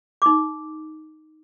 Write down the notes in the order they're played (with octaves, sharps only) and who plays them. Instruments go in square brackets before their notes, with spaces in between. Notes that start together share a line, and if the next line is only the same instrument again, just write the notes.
[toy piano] D#4 D6